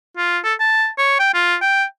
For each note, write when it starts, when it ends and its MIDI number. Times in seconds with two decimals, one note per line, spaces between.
0.17 0.39 65
0.44 0.54 69
0.60 0.89 81
0.98 1.16 73
1.20 1.32 79
1.34 1.55 65
1.61 1.84 79